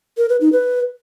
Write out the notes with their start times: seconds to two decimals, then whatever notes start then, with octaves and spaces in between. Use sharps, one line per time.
0.18 A#4
0.29 B4
0.41 D#4
0.52 B4